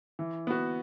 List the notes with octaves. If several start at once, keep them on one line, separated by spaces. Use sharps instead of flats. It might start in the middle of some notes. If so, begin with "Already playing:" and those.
E3
B3 F#4